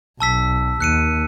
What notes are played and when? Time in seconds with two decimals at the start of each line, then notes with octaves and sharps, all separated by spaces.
0.20 B1 A5 E6 B6
0.80 D#2 F#6 C#7 D#7